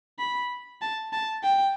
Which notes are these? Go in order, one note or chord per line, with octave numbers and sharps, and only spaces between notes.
B5
A5
A5
G5